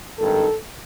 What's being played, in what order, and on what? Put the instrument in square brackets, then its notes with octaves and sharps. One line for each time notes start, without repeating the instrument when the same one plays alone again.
[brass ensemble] G#1 G2 D#3 A4